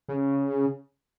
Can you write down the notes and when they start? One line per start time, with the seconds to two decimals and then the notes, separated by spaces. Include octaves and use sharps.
0.09 C#3